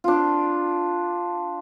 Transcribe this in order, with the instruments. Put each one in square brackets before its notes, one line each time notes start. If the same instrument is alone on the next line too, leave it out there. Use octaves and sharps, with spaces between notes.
[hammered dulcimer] D4 F4